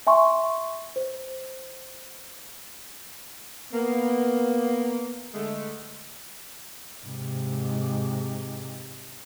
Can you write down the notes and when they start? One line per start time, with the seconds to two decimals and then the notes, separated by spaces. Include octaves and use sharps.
0.07 E5 G#5 C6 C#6
0.96 C5
3.73 A#3 B3
5.33 D3 G#3 A3
7.05 G#2 C3